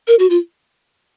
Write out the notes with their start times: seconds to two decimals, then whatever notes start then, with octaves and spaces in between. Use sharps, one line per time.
0.08 A#4
0.19 F#4
0.30 F4